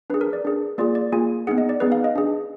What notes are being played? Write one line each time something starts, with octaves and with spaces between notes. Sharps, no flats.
D4 G#4 B4
A#4
D5
D4 G#4
A#3 F4 G#4 D5
D5
A#3 F4 G#4 G#5
B3 D#4 G#4 F#5
D#5
D5
B3 D#4 G#4 B4
F5
D#5
D4 G#4